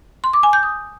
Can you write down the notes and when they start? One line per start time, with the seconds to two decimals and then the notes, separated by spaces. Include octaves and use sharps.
0.24 C6
0.33 D6
0.43 G#5
0.53 G6
0.63 D#6